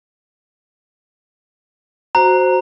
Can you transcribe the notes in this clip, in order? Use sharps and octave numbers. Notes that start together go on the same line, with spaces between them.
F#4 C5 A#5